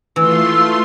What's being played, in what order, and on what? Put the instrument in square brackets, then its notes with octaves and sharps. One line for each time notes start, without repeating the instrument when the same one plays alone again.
[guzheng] E3 [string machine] A3 F4 C6 [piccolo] E6